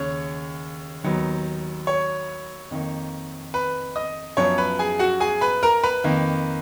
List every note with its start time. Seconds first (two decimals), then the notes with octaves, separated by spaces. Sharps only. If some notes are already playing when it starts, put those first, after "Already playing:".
Already playing: D#2 C#3 C#5 C#6
1.04 D#2 D#3 F#3 B3
1.87 C#5 C#6
2.71 F2 D#3 A#3
3.54 B4 B5
3.96 D#5 D#6
4.37 F#2 F3 B3 C#5 C#6
4.58 B4 B5
4.79 G#4 G#5
4.99 F#4 F#5
5.20 G#4 G#5
5.41 B4 B5
5.63 A#4 A#5
5.83 B4 B5
6.04 F2 D#3 A#3